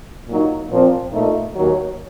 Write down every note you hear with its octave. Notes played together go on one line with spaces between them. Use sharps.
A#2 F#3 A#3 D#4
A#2 F3 C4
A#2 A3 D#4
D#2 D#3 F#3